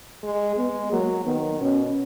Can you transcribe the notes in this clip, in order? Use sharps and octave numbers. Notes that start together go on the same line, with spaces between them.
G#3
G#3 B3
F#3 A#3
D#3 B3
B2 C#4